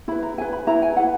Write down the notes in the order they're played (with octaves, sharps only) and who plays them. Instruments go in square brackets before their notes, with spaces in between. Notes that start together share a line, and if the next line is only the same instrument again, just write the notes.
[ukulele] E4 B4 B5
A#5
E4 B4 G#5
B5
E4 B4 A#5
G#5
E4 B4 F#5